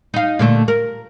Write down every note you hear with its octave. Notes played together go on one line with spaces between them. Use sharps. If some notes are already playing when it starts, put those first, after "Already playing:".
D#4 F5
A#2 D3 A3
A#4